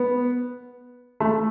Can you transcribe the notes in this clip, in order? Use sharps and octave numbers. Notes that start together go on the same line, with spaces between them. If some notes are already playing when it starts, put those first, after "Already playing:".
Already playing: B3
A3